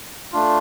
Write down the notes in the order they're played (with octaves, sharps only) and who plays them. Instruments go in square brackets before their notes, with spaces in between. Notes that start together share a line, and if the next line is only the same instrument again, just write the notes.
[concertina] A3 D4 F4